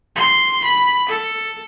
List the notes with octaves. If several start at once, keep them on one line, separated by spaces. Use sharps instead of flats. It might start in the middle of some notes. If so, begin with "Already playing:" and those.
C6
B5
A4